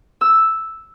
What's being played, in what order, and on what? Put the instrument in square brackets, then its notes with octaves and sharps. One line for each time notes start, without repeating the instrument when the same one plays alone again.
[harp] E6